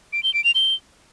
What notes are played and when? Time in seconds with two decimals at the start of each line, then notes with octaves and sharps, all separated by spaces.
0.13 D7
0.23 G7
0.34 D7
0.44 F7
0.55 G7